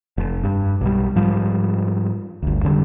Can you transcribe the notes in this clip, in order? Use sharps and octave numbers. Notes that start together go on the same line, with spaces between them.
F1
G2
B1 G3
G#2 F3 G3
G1 D2
F2 D3 D#3 G3